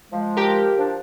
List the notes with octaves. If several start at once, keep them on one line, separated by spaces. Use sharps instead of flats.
F3 G#3
G4 A#4
F3 D4